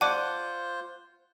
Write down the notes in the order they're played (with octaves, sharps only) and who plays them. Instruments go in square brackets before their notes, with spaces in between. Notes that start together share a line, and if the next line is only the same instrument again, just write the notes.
[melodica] F4 C5 [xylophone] D5 A5 [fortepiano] F#5 D6